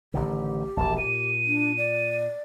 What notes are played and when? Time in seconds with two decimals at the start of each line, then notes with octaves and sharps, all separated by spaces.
0.14 A1 D3 D#3 G4
0.77 E1 A#1 A5
0.98 A#2 D#7
1.47 D4
1.78 D5